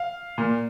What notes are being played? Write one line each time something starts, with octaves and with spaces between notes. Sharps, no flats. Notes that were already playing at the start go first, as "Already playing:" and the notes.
Already playing: F5
A#2